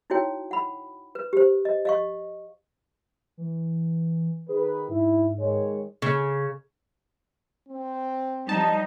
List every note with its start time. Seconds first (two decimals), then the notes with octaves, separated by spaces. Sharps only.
0.10 D#4 E4 F#4 C#5 G5
0.51 F#5 B5
1.15 B4
1.33 G4 C5
1.65 D#5
1.85 D#5 F5 C#6
3.37 E3
4.49 D#3 G#4 B4
4.89 G#2 E4
5.39 D#3 G#3 C#5
6.02 C#3
7.68 C4
8.49 F3 G3 D#4 A5